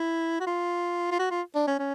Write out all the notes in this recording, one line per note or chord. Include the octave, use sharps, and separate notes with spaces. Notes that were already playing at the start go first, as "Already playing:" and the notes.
Already playing: E4
F#4
F4
F4
F#4
F4
D4
C#4
C#4